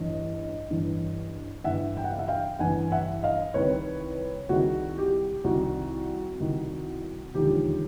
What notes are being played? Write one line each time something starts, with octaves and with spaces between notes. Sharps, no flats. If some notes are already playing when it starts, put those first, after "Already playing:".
Already playing: A1 G2 E3 D#5
A1 G2 E3
A1 G2 E3 E5 F#5
G5
F#5
F5
E5 F#5
F5 G5
A1 G2 E3 F#5 G#5
E5 F#5
D#5 F5
C2 C3 D#3 B4 C#5
C2 C3 D#3 F#4 G#4
G4
C2 C3 D#3 F#4
C2 C3 D#3
E1 D#2 D3 F3 G4